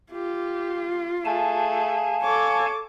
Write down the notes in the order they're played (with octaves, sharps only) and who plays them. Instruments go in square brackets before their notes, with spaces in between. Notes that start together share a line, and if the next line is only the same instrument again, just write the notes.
[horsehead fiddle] F4 [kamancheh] G4
[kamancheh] A3 G#4 [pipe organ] F5 G#5 A5
[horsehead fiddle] A4 C#5 [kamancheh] D6